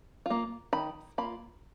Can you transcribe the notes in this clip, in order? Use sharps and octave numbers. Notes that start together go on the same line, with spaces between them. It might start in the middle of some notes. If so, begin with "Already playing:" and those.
A#3 F4
D#3 B5
A#3 F4 B5